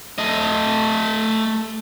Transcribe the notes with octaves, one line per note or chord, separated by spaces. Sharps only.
A3 D#5